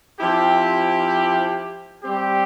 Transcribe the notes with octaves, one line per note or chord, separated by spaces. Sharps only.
F3 C4 E4 G4
G3 C4 G4